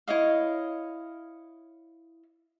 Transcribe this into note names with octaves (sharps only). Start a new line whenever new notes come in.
E4 C#5 D#5 F5